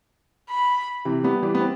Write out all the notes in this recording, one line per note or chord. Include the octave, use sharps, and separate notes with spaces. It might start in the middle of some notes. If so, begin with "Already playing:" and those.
B5
C3 E3
G3 B3
E3 G3
B3
C4